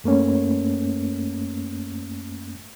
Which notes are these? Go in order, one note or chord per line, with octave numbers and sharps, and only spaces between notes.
F#2 A3 A#3 C#4